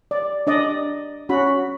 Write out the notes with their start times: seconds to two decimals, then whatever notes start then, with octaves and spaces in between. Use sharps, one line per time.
0.11 D5
0.47 D4 D5 D#5
1.29 C#4 F#4 B5